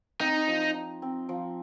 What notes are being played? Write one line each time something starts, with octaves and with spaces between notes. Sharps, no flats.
C4 D#4
F3
D#4
C4
F3